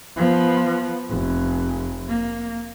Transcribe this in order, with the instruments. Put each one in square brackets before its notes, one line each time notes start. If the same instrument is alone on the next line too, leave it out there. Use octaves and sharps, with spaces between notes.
[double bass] F3 B3
F1
A#3